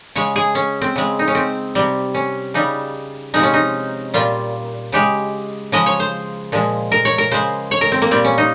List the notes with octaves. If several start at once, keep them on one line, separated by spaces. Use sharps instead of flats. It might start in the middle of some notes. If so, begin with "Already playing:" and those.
C#3 G#3 C#5
G#4
C#4
C4
C#3 G#3
D#4
C#4
C4
C3 G3
C#4
C#3 G3 D#4
C3 F3 G#3 D#4
C#4
D#4
A#2 G3 F4
C#3 G#3 G4
C#3 F3 G#3 D#5
C#5
C5
A#2 F3 G#3
A#4
C#5
A#4
C#3 G#3 C5
C#5
A#4
C4
A#3
A#2 G3 C4
C#4
D#4